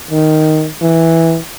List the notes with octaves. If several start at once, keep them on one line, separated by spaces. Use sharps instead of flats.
D#3
E3